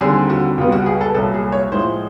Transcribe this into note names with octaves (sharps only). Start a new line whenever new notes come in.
D#2 D3 G3 C4 G#4
F#4
C#2 B2 G3 B3 F4
F#4
G#4
A4
C2 A#2 F#3 A4
G#4
C#5
A2 F3 G#3 C5